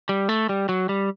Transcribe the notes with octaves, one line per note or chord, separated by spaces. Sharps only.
G3
A3
G3
F#3
G3